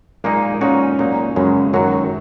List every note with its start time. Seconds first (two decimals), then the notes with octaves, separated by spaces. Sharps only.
0.24 A#2 G#3 A#3 D#4 G#4
0.61 A#2 G#3 C#4 D#4 F#4
0.99 A#2 F#3 A#3 D#4
1.36 F#2 C#3 F#3 G#3 C#4
1.73 F#2 D#3 F#3 D#4 F#4